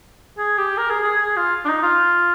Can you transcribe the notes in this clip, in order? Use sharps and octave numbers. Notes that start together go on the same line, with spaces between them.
G#4
G4
A#4
G#4
G#4
G#4
F4
D4
D#4
F4